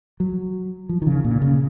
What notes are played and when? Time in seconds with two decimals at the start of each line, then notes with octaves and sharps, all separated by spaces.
0.20 F#3
0.89 F3
1.02 D#3
1.07 C#3
1.24 A#2
1.42 C#3